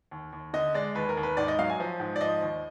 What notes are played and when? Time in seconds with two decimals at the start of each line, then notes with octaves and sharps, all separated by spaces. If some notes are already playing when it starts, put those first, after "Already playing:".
0.11 D#2
0.32 D#2
0.54 D3 D#5
0.74 G#3 D5
0.95 D#2 B4
1.09 A#4
1.17 D#2
1.23 B4
1.37 G#2 D5
1.48 D#5
1.59 F#3 F5
1.70 G#5
1.80 F3
2.00 G#2
2.16 D5
2.21 F3 D#5
2.42 D#2